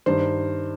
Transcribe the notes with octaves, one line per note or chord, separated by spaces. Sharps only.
G2 D#3 C5